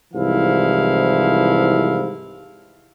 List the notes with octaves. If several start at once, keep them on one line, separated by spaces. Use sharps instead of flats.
C2 G#2 E3 F3 E4 F5